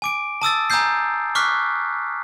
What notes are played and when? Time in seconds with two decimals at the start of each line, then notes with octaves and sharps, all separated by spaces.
0.02 G#5 D6 D7
0.42 A5 D#6 E6 A6
0.70 G#5 A#5 D#6 E6 G6 C7
1.35 C#6 D6 F6 F#6 B6 C7